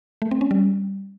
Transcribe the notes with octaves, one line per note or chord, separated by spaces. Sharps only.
A3
C4
C#4
G3